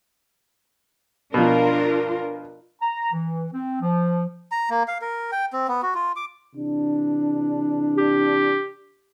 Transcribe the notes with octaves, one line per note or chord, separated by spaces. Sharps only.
B2 F3 D4 F4 A#4
A#5
E3
C4
F3
A#5
A#3
F5
A#4
G5
C4
B3
F#4
F4
D6
C3 E3 D4
G4